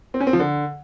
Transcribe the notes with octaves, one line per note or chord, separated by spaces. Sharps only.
C4
C#4
C4
F3
D3